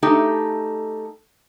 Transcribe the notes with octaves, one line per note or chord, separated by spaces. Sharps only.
A3 D#4 G4 A4